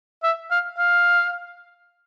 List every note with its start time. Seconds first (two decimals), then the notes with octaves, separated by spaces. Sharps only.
0.23 E5
0.51 F5
0.78 F5